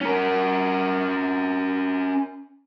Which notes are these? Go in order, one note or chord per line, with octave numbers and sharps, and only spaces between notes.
C#4 A#4